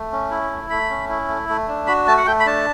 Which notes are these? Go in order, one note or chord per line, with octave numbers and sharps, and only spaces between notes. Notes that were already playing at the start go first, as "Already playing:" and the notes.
Already playing: A3
C#4
E4
A3
A3 B5
C#4
E4
A3
A3
D4
F#4 B5
A3 A5
F#5
A3 G5
B5
D4 A5